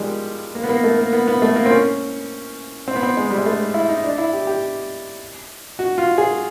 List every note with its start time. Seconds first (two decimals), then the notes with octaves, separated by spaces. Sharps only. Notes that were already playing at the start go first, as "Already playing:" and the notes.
Already playing: D#3 F3 G3 G#3
0.55 A#3
0.64 B3
0.69 A#3
0.84 A3
0.99 A#3
1.13 B3
1.28 B3
1.42 A3
1.56 A#3
1.66 C4
1.70 C#4
2.88 C4
2.96 B3
3.03 C4
3.17 G#3
3.31 G3
3.38 G#3
3.46 A3
3.74 E4
3.89 D#4
4.04 D4
4.18 E4
4.33 G4
4.47 G4
5.79 F#4
5.98 F4
6.18 G#4